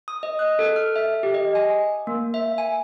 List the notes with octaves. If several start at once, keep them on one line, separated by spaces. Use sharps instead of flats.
D#6
D#5
F#6
A4
F6
E5
G4
D#5
G#5
A#3
E5
G#5